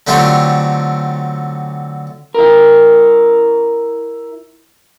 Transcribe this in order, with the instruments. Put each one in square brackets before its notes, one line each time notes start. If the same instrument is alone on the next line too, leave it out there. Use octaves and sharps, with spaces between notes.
[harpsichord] D3 F#3 A3 C4 F4 G4
[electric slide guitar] E4 A#4